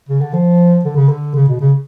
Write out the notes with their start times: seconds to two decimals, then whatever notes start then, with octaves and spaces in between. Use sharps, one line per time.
0.09 C#3
0.21 D3
0.33 F3
0.85 D3
0.96 C#3
1.08 D3
1.35 C#3
1.48 B2
1.60 C#3